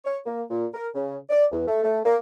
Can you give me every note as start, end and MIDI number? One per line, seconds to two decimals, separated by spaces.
0.05 0.17 73
0.26 0.43 58
0.50 0.66 46
0.74 0.87 70
0.95 1.16 49
1.29 1.45 74
1.51 1.63 40
1.67 1.83 57
1.83 1.99 57
2.05 2.18 58